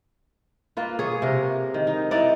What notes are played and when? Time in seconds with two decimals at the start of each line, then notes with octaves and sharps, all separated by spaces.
0.77 A#3 F4 B4
0.99 G#4 C#5
1.22 C3 A#4
1.74 D#3
1.87 D#4
2.11 D#4 E4 D5 F#5